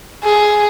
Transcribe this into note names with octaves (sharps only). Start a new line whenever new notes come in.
G#4